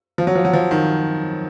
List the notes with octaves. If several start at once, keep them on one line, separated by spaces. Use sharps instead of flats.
F3
F#3
F3
F#3
F3
D#3